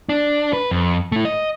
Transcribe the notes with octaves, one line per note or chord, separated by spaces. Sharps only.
D4
B4
F2
A3 E4
D#5